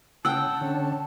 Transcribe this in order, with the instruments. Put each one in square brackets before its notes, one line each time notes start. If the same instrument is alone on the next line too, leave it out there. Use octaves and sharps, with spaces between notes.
[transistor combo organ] C#3 [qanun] F#5 G5 [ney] A5 [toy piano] E6
[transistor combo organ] D3 C#4